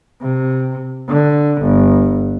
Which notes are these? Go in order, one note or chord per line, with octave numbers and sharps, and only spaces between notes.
C3
D3
G1